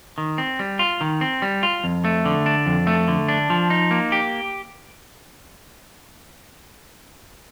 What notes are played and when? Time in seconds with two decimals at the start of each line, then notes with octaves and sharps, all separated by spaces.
0.18 D#3
0.38 C4
0.59 G3
0.79 F4
1.01 D#3
1.21 C4
1.42 G3
1.63 F4
1.84 F2
2.05 A3
2.25 D3
2.46 D4
2.67 F2
2.87 A3
3.08 D3
3.29 D4
3.50 F3
3.70 D#4
3.91 A#3
4.12 G4